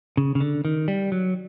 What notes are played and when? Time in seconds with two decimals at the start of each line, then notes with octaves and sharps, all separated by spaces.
0.17 C#3
0.35 C#3
0.41 D3
0.65 D#3
0.88 G3
1.12 F#3